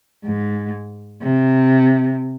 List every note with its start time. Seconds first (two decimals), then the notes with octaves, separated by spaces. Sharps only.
0.25 G#2
1.22 C3